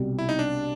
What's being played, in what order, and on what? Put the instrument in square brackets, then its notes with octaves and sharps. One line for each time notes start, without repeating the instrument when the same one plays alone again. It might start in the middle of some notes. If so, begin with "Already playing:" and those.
Already playing: [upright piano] C2 B2 G3
[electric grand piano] E4
D#4
D4